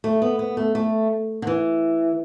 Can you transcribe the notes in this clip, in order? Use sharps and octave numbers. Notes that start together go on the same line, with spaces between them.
A3
B3
B3
A3
A3
D3
E3